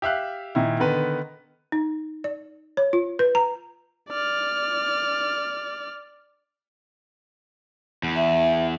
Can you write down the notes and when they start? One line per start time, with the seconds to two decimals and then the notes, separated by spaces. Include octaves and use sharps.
0.02 G4 E5 F5 F#6
0.55 A#2 D#3 E4
0.79 D3 D#3 B3 B4
1.72 D#4
2.24 D5
2.77 C#5
2.93 F4
3.19 B4
3.35 A#5
4.09 D5 F6
8.03 E2
8.16 E5